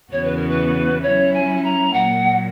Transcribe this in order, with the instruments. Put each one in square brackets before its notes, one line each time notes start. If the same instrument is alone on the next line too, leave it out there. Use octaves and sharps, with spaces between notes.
[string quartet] E2 C#3 E3 B3 F#4 [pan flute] C#5
[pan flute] B4
A#4
B4
[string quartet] F#3 C#4 E4 [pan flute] C#5
[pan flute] G#5
A#5
[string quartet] A#2 F#3 A#3 [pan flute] F#5